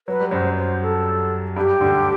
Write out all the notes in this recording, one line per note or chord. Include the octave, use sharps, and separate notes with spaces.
F#3 B4
G3
F#2 F#3 C5
C5
A4
G2 G3 G4
D2 D3